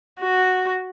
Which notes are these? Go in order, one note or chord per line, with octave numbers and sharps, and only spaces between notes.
F#4